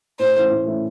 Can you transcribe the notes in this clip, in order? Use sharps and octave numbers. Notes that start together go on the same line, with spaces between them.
A2 C5
E3 A3 C#4 E4
A2
E3 A3 C#4 E4